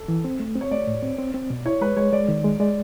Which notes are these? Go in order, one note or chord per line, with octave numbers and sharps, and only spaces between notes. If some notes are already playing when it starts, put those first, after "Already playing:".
Already playing: A4
E3
C4
A3
C4
C#5
A3 D5
A2
C4
C4
C4
B2
E4 C#5
G#3 B4
G#3 C#5
G#3 D5
D#3
G#3
G#3 D5